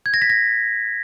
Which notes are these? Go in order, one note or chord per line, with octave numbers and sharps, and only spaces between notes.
G#6
A#6
B6
A#6